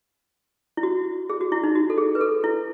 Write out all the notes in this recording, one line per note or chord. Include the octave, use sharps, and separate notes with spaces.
E4
F#4
G#4
F#4
E4
D#4
F#4
A4
G#4
B4
A4
E4